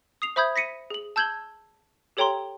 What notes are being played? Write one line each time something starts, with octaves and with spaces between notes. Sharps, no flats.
D#6 C7 F7
C5 E5 B5 D#6 G6 G#6
A#6 B6 C#7 D#7
G#4 F#7
A5 E6 G6 G#6 F#7 G7
G4 A4 C#5 G5 A#5 C6